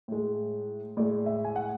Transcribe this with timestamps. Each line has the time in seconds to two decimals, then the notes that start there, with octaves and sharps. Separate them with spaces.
0.08 A2 G#3
0.97 A2 G#3 D5
1.26 E5
1.44 G#5
1.56 F#5